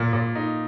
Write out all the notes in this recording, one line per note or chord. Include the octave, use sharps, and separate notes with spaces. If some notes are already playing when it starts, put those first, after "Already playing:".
Already playing: A#2
A#2
D#4